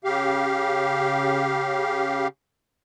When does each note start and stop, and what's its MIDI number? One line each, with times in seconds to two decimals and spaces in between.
0.04 2.28 49
0.04 2.28 67
0.04 2.28 77